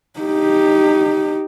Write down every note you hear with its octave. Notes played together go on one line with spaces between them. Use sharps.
D#4 G4